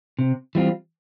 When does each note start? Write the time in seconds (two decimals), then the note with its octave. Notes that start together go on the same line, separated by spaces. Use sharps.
0.19 C3
0.55 E3 G3 C4 F4